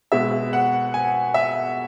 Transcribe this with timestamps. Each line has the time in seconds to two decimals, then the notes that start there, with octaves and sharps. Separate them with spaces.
0.12 B2 G#3 E5
0.53 F#5
0.94 G#5
1.34 E5